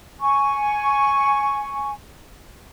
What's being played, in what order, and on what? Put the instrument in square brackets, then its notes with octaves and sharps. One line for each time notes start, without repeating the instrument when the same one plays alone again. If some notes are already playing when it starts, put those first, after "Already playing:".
[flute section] G#5 C#6